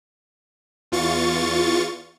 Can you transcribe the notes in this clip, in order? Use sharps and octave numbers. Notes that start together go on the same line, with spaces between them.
E2 F4 C#6 A6